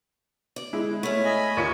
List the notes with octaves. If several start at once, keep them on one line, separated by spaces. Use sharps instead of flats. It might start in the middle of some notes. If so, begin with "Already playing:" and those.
D5
G#3 E4
A3 C#4
D#5 G#5 B5
D#2 F4 C#7